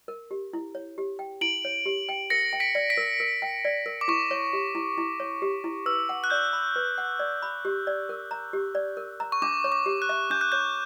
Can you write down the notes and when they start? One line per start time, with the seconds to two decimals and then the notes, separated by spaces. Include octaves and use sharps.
0.08 A#4
0.31 G4
0.53 E4
0.75 C#5
0.98 G4
1.19 G5
1.41 E4 D7 F#7
1.65 C#5
1.86 G4
2.09 G5
2.30 A#4 A#6 C#7
2.53 G5
2.60 B6 D7
2.75 D5
2.90 B6 D7
2.97 A#4
3.20 A#4
3.42 G5
3.65 D5
3.86 A#4
4.01 D6
4.08 E4 C#6
4.31 C#5
4.53 G4
4.75 E4
4.98 E4
5.20 C#5
5.42 G4
5.64 E4
5.86 B4 E6
6.09 F#5
6.24 F#6
6.30 D5 G6
6.53 B5
6.76 B4
6.98 F#5
7.19 D5
7.42 B5
7.65 G4
7.87 D5
8.09 A#4
8.31 A#5
8.53 G4
8.75 D5
8.97 A#4
9.20 A#5
9.32 C#6
9.42 D4 D6
9.64 C#5
9.72 D6
9.86 G4
10.02 F#6
10.09 E5
10.30 D4 G6
10.41 F#6
10.52 C#5 G6